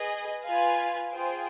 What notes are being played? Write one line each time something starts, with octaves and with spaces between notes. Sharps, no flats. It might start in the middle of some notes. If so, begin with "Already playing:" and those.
Already playing: G#4 B4 D#5
F4 B4 F5 G#5
F4 G#4 C5 G5